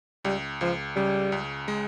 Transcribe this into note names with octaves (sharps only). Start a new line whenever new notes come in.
C#2 G3
C#2 F3
C#3 G3
C#2
G#3